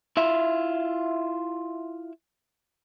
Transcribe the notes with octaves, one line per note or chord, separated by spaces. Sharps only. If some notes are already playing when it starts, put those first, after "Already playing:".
E4 F4 E5